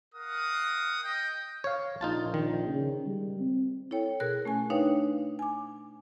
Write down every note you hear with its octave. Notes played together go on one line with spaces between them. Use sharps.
A#4 F5 F#5 D#6
D#5 G5
C#5 F5
A#1 D#4 F4 A5
D#3
C#3
G3
C4
E4 A4 C#5 G5
B2 G#4 A#4 F#6
A3 C#4 G#5
D4 D#4 B4 C#5 F5 G5
G#5 D6